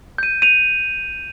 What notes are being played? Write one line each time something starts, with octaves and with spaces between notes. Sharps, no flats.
G6 D#7
D#7 F7